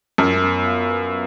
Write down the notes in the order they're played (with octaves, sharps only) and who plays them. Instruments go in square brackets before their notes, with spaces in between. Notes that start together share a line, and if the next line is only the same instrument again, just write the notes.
[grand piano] F#2 [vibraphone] F4
[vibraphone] B3
F5
B4